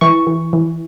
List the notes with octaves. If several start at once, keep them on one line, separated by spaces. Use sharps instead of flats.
E3 C#6
E3
E3